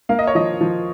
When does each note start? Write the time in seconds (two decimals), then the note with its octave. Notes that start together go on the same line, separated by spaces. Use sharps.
0.09 A#3 F5
0.19 D#5
0.27 C#5
0.35 F3 D#5
0.61 F3